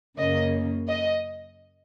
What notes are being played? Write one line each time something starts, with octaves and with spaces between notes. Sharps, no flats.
F#2 C#3 A#3 D#5
D#5